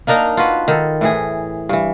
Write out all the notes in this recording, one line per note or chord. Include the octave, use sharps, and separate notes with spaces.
A#3 D4 D#4 A#4
F4 F#4 B4
D#3 A4
A2 E3 G#4
G2 E3